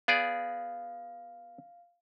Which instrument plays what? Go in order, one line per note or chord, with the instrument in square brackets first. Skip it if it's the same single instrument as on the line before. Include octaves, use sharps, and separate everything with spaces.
[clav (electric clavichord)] B3 G#4 D5 [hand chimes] F5